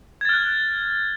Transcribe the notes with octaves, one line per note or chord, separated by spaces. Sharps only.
F6 F#6 G#6 A6